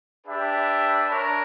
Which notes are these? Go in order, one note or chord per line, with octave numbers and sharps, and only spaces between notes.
D4 G4 B4 E5
D4 A#4 C#5